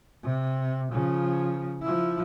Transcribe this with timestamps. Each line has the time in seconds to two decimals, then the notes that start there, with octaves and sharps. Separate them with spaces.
0.23 C3
0.92 C#3 F3
1.82 F3 E4